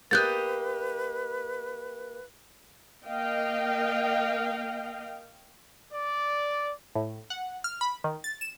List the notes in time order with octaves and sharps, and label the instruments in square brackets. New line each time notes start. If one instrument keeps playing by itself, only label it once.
[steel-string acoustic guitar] A#3 G4 D#5 [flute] B4 [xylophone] F#6 G6 A6
[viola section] A#3 D#5 F5 G5
[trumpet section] D5
[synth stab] A2
F#5
F6
B5
D#3
A6
E7